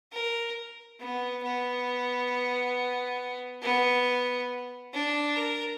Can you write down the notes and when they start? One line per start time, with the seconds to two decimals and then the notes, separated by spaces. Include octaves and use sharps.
0.12 A#4
1.00 B3
1.43 B3
3.62 B3
4.93 D4
5.36 A#4